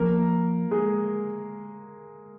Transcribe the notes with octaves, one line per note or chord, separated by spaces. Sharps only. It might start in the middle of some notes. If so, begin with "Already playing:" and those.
Already playing: F3 A#3 A#4
G#3 G#4